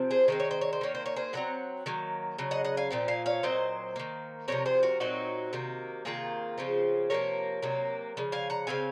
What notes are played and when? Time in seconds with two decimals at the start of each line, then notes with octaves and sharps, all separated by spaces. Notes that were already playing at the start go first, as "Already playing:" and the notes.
Already playing: C3 F3 C4
0.11 G#4 C5
0.28 D#3 G#3 C4 C5
0.40 C#5
0.51 C5
0.61 C#5
0.73 C5
0.81 D#3 A#3 C#5
0.95 C5
1.06 C#5
1.16 G#4 C5
1.33 A#2 F#3 C4 F#5 A#5
1.86 D#3 F#3 A#3
2.38 C#3 F#3
2.51 D#5 F#5
2.65 D#5 F#5
2.77 F5 G#5
2.90 A#2 F3 C4
3.08 F5 G#5
3.26 C#5 F5
3.43 A#2 F#3 C4 C5 D#5
3.96 D#3 A#3
4.48 C3 F3 G#3 C4 A#4 C#5
4.66 G#4 C5
4.83 F#4 A#4
5.00 A#2 F#3 C4 D#4 F#4
5.53 C3 D#3 A#3
6.05 C3 D#3 A#3 F4 G#4
6.58 C#3 F3 C4
7.10 C3 F3 A#3 A#4 C#5
7.63 C3 F#3 A#3
8.17 C#3 F3
8.32 F5 G#5
8.50 F#5 A#5
8.67 C#3 G#3 C4 F5 G#5